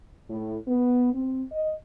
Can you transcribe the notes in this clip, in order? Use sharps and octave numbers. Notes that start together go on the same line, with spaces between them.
A2
B3
C4
D#5